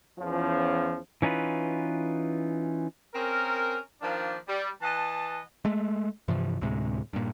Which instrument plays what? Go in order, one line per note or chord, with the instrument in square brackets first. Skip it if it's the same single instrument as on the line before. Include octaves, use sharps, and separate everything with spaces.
[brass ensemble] E2 F3 C#4
[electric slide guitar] E3 C#4 D#4 F4 B4
[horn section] C4 C#4 G#4 A#4
D#3 F3 A#3 D4
G3
E3 D#5 F#5 A5
[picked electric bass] G#3 A3
G2 C3 E3 F3
D2 A2 C3 G#3
G2 A#2